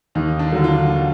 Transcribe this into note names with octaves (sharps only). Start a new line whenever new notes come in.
D#2 D#4
D4
D3 F#3
F4
D#2